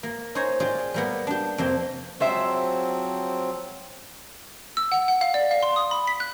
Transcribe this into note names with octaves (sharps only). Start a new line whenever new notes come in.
A#3
D#4 C5 C#5 G#5 A#5
F4 G4 G#4 D5
G3 A#3 B3
D4 G4
F2 C3 A#3 C4 G4
F3 F#3 G#3 C4 C5 E5
E6
F#5
F#5
F5
D5
F5
C6
D#6
B5
B6
F#6